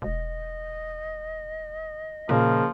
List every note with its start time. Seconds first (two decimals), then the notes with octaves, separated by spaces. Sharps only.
0.02 E1 D#5
2.29 A#2 C#3 F3 A#3